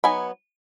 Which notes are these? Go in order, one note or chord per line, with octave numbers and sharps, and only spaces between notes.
F#3 B3 D#4 G#5 B5